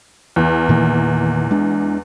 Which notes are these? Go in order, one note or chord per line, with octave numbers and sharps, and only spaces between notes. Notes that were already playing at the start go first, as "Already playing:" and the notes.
E2
A#2 D#3 A#3
G#3 D4